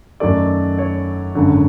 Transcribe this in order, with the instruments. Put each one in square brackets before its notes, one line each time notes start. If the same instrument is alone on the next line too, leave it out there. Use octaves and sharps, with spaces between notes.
[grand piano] F#2 D#3 F#3 A3 D5
C#5
G#1 F#2 D3